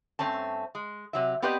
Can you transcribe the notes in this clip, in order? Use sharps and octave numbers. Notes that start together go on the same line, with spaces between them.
G2 B2 A3 C4 C#4 A5
G#3
C3 F#3 E5
B3 C4 G4 B4 D5 D#5